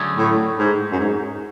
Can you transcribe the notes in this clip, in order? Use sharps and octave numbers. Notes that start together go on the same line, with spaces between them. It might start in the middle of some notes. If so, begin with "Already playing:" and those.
Already playing: D3 F#3 A3 C#4 G#4
A2
G#2
F#2
G#2